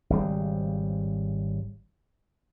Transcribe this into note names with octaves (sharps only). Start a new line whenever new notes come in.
G#1 C#3 G3